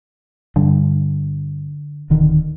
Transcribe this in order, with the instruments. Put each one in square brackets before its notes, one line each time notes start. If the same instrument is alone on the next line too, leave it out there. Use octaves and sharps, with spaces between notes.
[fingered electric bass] G2 [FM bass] D3
[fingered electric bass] D1 D3 D#3